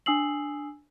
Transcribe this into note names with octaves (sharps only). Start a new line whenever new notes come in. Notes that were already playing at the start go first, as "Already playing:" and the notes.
D4 G#5 D#6 E6 C7 F#7